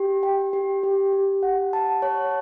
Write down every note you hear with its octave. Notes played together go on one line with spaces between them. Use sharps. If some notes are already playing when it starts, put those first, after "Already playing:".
Already playing: G4
G5
G4
G4
G4
F#5
A5
C#5